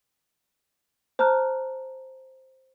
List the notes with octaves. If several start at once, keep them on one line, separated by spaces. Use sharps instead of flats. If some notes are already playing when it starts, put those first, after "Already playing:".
C5 A5 A#5 F6 F#6